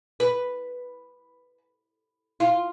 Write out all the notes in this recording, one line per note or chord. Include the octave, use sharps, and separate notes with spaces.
B4
F4